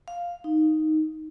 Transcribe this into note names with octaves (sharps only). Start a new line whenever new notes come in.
F5
D#4